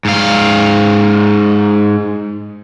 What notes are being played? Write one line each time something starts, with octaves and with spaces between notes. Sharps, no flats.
G#2 F5